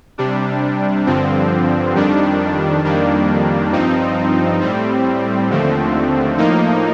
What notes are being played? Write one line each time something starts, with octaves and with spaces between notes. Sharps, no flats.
C3 G3 D4
G2 D3 F3 C4
F2 D#3 G3 D4
F2 D#3 G3 A#3 D4
G2 F3 C4 D#4
A2 G3 C4
D#2 D3 F3 A3 C4
A2 F3 A#3 D#4